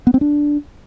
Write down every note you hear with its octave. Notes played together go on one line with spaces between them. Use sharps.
B3
C4
D4